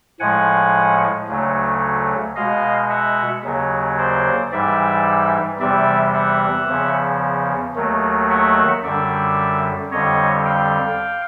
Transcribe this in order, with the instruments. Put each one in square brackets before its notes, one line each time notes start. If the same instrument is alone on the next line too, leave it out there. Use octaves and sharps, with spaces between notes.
[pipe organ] A2 F3 G#3 F#5 G#5
D2 C#3 F#3 A3
B2 G#3 D#5 F5
E5 F#5
D#2 C#3 F#3
C5 D5
G#2 E3 G3 D5 E5
E2 C3 E3 G3 D5 E5
E5 F#5
E2 C#3 F3
D#2 D#3 F#3 A3
E5 F#5
F#2 D3 G3 D5 E5
F2 D3 G3 C#5 D#5
F5 G5